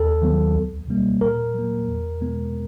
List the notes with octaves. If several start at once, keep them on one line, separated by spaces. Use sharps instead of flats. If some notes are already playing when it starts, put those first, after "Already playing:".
Already playing: D#2 A4
D#3 F#3 B3
C#2
B2 G3 A#3
A#2 A#4
F#3 A#3
E2
B2 G#3 B3